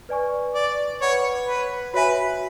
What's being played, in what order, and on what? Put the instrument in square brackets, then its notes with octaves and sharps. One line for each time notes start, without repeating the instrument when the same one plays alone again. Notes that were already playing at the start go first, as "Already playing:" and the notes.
[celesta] B4 D5 G#5 C#6
[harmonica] D5
[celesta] B4 F#5 B5 D6 [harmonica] C#5
[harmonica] B4
[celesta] F#4 C#5 E5 G#5 [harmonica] B4